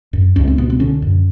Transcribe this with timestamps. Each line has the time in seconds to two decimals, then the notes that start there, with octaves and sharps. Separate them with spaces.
0.13 F#2
0.36 C#2 C#4
0.48 C4
0.58 B2 B3
0.70 C4
0.80 D3 C#4
1.02 F#2